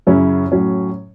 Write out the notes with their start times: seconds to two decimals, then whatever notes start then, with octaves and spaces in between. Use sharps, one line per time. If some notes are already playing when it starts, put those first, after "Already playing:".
0.07 F#2 C#3 F#3 C#4 E4
0.52 A2 F#3 C#4